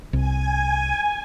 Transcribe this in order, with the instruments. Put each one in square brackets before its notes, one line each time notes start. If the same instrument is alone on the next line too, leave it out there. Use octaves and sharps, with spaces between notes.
[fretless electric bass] C2 [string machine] G#5